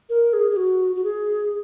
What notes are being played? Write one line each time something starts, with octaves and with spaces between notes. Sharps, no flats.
A#4
G#4
G#4
F#4
F#4
G#4